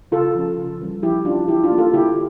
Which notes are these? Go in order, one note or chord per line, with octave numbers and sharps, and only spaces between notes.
C#3 F4 A4
F3 C#4
C#3
E3 G3 C#4
F3 E4 G4
C#4 D4 F4
E3 E4 G4
D4 F4
A#3 C#4
F4 A4
D3 E4 G4